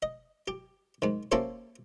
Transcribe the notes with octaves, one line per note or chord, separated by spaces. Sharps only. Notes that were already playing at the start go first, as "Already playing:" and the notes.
D#5
G4
G#2 D#3
A#3 C#4 E4 G4 A4 C5